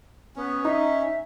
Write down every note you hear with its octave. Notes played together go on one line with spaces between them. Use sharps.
B3 C#4
D#4 E5